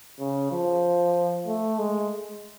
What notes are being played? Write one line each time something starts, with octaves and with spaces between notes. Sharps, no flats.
C#3
F3
A3
G#3